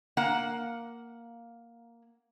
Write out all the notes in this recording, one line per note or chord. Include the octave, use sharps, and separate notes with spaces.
A#3 F#5